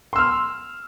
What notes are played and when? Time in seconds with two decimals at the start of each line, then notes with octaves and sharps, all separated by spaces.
0.13 C6
0.16 E6
0.18 F6